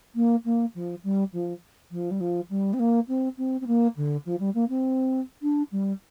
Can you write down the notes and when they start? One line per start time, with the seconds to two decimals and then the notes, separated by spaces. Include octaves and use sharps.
0.15 A#3
0.45 A#3
0.75 F3
1.04 G3
1.33 F3
1.92 F3
2.11 G3
2.21 F3
2.50 G3
2.74 C4
2.79 A#3
3.08 C4
3.38 C4
3.61 C4
3.67 A#3
3.96 D3
4.26 F3
4.40 G3
4.55 A#3
4.69 C4
5.42 D4
5.72 G3